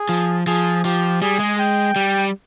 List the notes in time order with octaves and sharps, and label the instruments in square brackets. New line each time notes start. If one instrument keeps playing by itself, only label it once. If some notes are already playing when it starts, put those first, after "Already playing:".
Already playing: [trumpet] G#4
[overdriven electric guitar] F3
[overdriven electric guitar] F3 [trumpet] G#4
[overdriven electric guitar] F3 [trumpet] G4
[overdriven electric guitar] G3 [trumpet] G#4
[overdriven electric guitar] G#3
[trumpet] G5
[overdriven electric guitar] G3